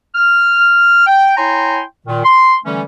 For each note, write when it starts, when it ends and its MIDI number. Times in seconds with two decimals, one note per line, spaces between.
0.15 1.06 89
1.07 1.35 79
1.37 1.81 64
1.37 1.81 73
1.37 1.81 79
1.37 1.81 80
1.37 1.81 82
1.37 1.81 84
2.07 2.23 46
2.07 2.23 51
2.24 2.56 84
2.65 2.82 50
2.65 2.82 52
2.65 2.82 55
2.65 2.82 57
2.65 2.82 61